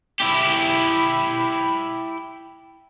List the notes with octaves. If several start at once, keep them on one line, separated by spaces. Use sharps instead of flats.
E4 G4